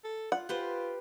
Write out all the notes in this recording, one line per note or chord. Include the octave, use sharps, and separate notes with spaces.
A4
F4 F#5
F4 G4 B4 C5